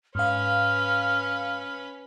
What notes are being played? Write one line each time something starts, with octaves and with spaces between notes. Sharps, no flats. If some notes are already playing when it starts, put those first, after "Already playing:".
G#2 C#4 B4 F5 F6